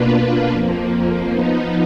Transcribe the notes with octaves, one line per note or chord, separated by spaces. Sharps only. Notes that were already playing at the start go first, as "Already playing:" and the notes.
Already playing: B2 A#3 D4 F4 B4
F2 F3 A#3
F3 B3 D#4